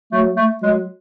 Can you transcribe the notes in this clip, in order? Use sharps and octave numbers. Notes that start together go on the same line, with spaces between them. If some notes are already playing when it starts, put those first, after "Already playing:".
F#3 A3
A3
F#3 G#3